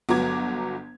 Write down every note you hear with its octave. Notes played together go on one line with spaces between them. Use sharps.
G1 F#3 B3 A#5 D6 G#6